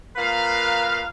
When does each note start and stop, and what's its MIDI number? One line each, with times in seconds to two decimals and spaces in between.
0.16 1.05 46
0.16 1.05 70
0.16 1.05 71
0.16 1.05 77